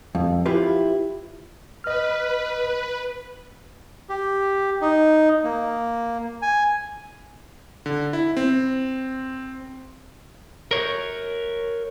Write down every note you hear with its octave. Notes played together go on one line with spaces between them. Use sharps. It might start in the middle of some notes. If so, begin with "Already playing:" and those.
F2
E4 F4 G4 B4
B4 D#5 F6
G4
D#4
A#3
G#5
D3
E4
C4
A#4 C#5